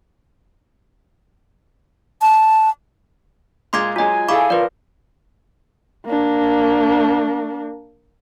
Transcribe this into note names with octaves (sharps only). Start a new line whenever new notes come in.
A5
A#2 G#3 F4 C6 D6 G#6
F#3 G#3 F4 D#5 G#5
E4 G#4 A4 F5 B5 C#6 D6
F3 F4 A#4 B4 D5
A#3 D4